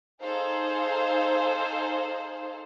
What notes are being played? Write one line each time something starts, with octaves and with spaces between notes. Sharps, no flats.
D#4 G#4 A4 C5 F5